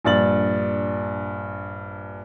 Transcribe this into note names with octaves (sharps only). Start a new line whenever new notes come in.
A#1 G2 A6 F#7